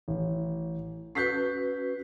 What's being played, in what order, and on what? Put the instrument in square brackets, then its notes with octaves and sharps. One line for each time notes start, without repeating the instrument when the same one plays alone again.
[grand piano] A1
[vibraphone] C#4 F#4 B4 [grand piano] G6 B6 C7